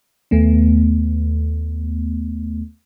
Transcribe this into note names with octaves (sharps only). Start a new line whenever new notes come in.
D#2 A3 B3